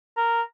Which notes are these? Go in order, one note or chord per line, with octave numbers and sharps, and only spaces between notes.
A#4